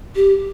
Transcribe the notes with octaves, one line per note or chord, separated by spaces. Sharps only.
G4